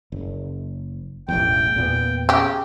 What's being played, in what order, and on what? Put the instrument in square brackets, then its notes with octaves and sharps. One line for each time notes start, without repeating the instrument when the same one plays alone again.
[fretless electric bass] F#1
[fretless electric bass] E1 A1 E2 [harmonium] G5
[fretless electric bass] E2 A#2 B3
[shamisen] C#3 G4